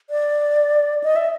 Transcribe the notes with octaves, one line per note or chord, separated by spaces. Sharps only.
D5
D#5
E5